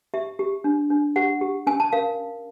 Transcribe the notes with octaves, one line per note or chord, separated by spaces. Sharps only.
G4 E5
G4
D4
D4
G4 F#5
G4
C#4 G#5
A5
A#4 F5